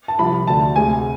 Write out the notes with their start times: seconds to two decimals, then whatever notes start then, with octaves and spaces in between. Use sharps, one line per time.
0.08 A5
0.19 C2 C3 F3 B5
0.47 D2 D3 A3 A5
0.76 D2 C3 G#3 G#5